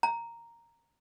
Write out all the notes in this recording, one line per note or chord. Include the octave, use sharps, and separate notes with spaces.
A#5